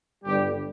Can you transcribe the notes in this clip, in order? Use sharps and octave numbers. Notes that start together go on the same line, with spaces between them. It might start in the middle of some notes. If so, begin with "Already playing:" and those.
G1 G2 D3 G3 G4